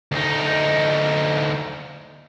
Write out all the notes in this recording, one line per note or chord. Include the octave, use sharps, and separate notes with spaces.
D2 D#4